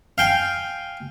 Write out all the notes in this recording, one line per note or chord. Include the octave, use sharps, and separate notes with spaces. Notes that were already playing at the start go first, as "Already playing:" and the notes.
F5 G5 G#5